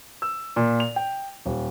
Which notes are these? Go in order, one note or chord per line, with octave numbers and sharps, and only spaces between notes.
E6
A#2
F7
G5
D#1